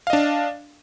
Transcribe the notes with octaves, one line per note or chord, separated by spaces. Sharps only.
D4 D#5 F5